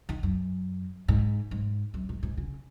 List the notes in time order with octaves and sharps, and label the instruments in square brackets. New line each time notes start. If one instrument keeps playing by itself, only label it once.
[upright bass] D#3
F#2
G#2
G#2
F#2
G#2
G#2
C#3